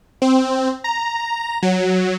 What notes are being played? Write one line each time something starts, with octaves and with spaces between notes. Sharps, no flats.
C4
A#5
F#3